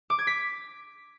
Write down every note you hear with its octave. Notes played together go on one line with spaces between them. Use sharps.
D6
G#6
B6